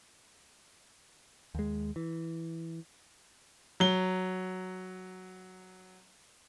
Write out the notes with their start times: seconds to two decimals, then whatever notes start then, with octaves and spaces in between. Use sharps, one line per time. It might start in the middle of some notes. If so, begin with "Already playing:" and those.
1.55 D#2 G#3
1.96 E3
3.80 F#3 G7